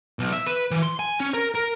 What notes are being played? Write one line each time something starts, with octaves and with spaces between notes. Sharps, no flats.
B1
E5
B4
E3
C6
G#5
C#4
A#4
A#4